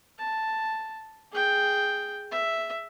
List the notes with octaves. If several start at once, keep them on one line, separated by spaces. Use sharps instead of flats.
A5
G#4 G5
E5